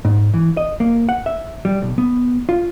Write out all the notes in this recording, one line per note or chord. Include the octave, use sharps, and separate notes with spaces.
G#2
E3
D#5
A#3
F#5
E5
G3
B1
B3
F4